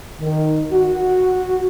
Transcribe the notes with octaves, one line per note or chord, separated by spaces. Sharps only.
D#3
F#4